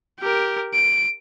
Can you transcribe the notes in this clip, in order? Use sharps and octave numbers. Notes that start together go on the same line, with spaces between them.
G4 A#4
D7